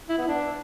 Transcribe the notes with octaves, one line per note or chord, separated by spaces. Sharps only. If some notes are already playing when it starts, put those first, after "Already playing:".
E4
B3
D4